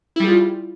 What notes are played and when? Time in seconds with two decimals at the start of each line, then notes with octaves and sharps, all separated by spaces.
0.16 E4
0.20 G3
0.24 G#4
0.28 F4